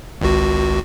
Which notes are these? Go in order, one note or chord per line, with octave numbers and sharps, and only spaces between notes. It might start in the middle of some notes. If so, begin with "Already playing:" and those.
G#1 C#2 F#4